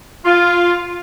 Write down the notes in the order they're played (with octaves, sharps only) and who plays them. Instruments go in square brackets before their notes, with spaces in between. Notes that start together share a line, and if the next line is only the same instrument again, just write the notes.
[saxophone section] F4